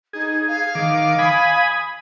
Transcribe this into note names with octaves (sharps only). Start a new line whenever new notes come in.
D#4 G#4
F5
D#3 D6
G#5 B5 D#6